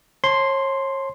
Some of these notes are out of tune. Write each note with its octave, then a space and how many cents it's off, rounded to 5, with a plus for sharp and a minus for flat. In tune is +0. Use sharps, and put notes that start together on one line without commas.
C#5 -35 A5 +0 C6 +0